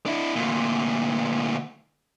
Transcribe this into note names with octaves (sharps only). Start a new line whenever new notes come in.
D4 E4
D2 A#2